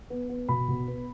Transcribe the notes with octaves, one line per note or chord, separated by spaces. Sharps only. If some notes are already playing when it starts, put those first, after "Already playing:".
B3
B3
B2 B5
B2
B3